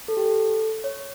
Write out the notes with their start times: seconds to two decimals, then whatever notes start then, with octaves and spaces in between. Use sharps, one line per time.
0.08 A4
0.17 G4
0.26 A4
0.84 C#5